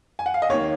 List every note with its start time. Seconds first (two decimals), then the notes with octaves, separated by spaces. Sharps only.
0.19 G#5
0.26 F#5
0.34 F5
0.42 D#5
0.49 D#2 D#3 A#3 C#5